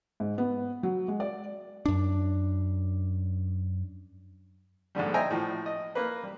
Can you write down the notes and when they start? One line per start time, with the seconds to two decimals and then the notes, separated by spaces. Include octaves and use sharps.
0.20 G#2
0.38 B3
0.83 F#3
1.08 G#3
1.20 D5
1.86 F#2 D4
4.95 A#1 G#2 D3 G3
5.14 C5 D#5 E5 G5 G#5 A#5
5.30 A2 F3
5.66 D#5
5.95 A#3 B4
6.23 G3